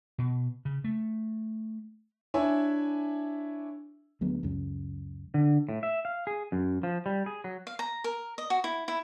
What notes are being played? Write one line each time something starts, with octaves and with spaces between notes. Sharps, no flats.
B2
C#3
A3
D4 E4 C#5 E5 G#5
D2 F#3 G#3 B3
C#2 F#2 C#3
D3
A2
E5
F5
G#4
F#2
F3
G3
G#4
F#3
F5
A#5
A#4
D#5
F#4
E4
E4